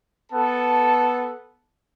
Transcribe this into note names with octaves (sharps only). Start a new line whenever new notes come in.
B3 A4 A5